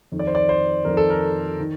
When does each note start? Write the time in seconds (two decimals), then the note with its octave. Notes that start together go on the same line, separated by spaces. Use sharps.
0.12 F2 D#3
0.19 D5
0.27 C5
0.35 D5
0.49 C5
0.85 F2 D#3 A#4
0.97 A4
1.10 A#4
1.60 D#3